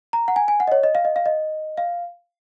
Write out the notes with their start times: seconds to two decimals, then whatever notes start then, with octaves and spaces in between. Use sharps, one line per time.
0.13 A#5
0.28 F#5
0.36 G#5
0.48 G#5
0.60 F#5
0.68 D#5
0.72 C#5
0.83 D#5
0.95 F5
1.05 D#5
1.16 F5
1.26 D#5
1.77 F5